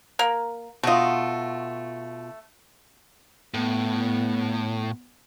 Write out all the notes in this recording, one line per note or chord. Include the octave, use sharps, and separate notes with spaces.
A#3 A#4
B2 A3 F4 D#5
A2 B3